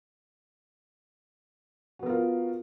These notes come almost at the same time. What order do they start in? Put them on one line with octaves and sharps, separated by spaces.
F#4 B3 A#4 F4